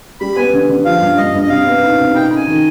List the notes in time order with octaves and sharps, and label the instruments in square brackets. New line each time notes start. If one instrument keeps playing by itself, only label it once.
[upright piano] G3 [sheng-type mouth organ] B5
[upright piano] B3 [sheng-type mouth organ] G#5
[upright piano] D3
D3
[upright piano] F3 [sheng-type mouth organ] F5
[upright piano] G2
[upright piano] G2 [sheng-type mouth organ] D#5
[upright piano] G2
[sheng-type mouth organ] D#5
[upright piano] C3 [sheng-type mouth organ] F5
[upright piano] B3
D#4
C3
[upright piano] D#4 [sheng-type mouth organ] G5
[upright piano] D#4
[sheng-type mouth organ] G#5
[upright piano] D#3